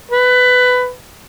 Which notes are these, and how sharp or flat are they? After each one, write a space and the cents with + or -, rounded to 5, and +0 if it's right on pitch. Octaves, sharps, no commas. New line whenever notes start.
B4 +15